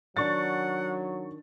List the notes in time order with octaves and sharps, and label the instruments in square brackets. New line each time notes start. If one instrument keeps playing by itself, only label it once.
[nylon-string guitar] D#3 D4 [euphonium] F#3 [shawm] F#5 [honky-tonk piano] C#6 A6